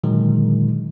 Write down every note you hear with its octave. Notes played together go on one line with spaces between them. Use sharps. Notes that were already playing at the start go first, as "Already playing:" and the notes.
A#2 D3 D#3 F#3 G#3